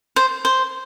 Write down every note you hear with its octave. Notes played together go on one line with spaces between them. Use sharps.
C5
C5